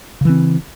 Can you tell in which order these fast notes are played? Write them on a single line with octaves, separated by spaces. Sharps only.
C#3 E3 C4